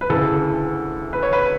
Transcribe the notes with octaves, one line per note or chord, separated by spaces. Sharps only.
B4
D2 C#3 E3 A4
B4
C#5
B4